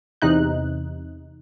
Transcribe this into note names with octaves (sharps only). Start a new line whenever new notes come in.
E2 C3 D#4 F#6